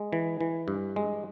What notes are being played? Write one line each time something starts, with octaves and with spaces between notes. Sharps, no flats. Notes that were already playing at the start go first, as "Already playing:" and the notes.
Already playing: G#3
E3
E3
G2
G#3